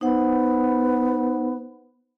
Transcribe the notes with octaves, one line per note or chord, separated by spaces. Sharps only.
B3 D#4 C5 F#5